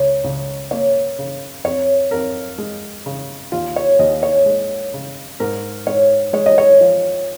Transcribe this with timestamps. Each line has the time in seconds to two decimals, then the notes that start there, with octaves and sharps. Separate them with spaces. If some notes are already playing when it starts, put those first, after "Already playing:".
Already playing: C#2 C#5
0.24 C#2
0.71 A#3 C#5
1.19 C#3
1.64 F2 C#5
2.11 F2 A#4
2.58 G#3
3.06 C#3
3.52 D#2 F4
3.76 C#5
3.99 D#2 D#5
4.23 C#5
4.46 G#3
4.94 C#3
5.40 G#2 A#4
5.87 G#2 C#5
6.33 G#3 C#5
6.46 D#5
6.58 C#5
6.81 F3